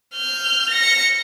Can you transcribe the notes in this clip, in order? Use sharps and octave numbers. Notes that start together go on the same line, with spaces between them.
F6 G6
A#6 C#7